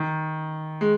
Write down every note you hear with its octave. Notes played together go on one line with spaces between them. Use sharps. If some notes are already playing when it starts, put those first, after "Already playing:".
Already playing: D#3
G#3